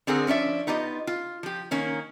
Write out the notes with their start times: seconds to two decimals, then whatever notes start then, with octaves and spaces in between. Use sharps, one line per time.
0.07 D3 C4 G#4 A#4 F#5
0.27 F3 C#4 D4 E5
0.67 B3 D#4 F4 G4 D#5
1.07 F4
1.43 F3 G4
1.71 D#3 A#3 C#4